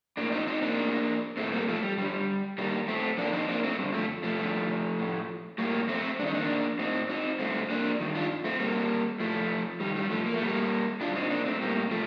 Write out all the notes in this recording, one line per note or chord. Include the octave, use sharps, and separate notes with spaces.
A2 A#3 D4
C4 D#4
C4 D#4
A#3 D4
A2
A2 A3 C4
G3 A#3
F3 A3
G3
G2 D3 G3
G2 D#3 G3 A#3
A3 C4
F2 D#3 A#3 D4
C4 D#4
A#3 D4
A3 C4
G2 D3
F3 A3
F3 A3
G2 D3
A2
A2 G3 A#3
A3 C4
G2 D#3 D4 D#4
A#3 D4
A2 C4 D#4
C4 D#4
G2 D3 A3 C4
A#3 D4
G2 D#3
D4 F4
A3 C4
G2 D3 G3 A#3
A2 F3 A3
G2 D#3 G3
G3
F3 A3
A#3
A3
A2 G3 A#3
G2 D3 D4 F4
C4 D#4
A#3 D4
A3 C4
A2 G3 A#3
F3 A3